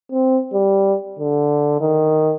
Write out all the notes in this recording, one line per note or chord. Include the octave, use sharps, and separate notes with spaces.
C4
G3
D3
D#3